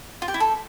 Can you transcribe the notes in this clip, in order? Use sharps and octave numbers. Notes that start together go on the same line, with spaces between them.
F4
G4
E4
A4